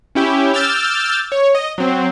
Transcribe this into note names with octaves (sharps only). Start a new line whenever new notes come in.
C#4 E4 G4
D6 E6 F6 G6 A6
C#5
D#5
F#3 C4